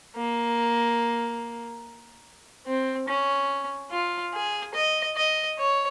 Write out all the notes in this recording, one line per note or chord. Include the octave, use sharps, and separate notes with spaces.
A#3
C4
C#4
F4
G#4
D#5
D#5
C#5